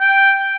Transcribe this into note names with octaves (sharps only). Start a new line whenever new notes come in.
G5